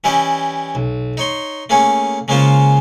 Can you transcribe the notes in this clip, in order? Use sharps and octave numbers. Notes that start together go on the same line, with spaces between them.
E3 G3 C#4 E4 G4 D#5
B1
D#4 C#5 C6
A3 A#3 C#4 G#4 C#5
C#3 G#3 A#3 C#4 F4 C5